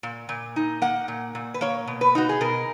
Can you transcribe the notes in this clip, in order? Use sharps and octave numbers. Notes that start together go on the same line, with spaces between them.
A#2
A#2
D#4
A#3 F#5
A#2
A#2
B4
A#3 C#5
B2
B4
D#4 F#4
G#4
B2 A#4